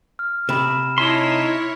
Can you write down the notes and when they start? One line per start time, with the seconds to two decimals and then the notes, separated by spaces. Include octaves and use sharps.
0.19 F6
0.49 C3 B5 E7
0.98 D#4 E4 C#5 A5 C6 B6